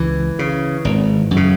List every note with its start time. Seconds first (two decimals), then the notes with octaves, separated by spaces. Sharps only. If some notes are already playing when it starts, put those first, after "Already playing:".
Already playing: C#2 E3
0.39 C#3
0.85 G#1
1.31 F#2
1.36 C#3